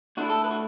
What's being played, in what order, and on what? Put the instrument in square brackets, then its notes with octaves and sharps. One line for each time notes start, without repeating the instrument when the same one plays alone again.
[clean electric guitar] D2 D3 A3 E4 F#4
A4
B4
F#4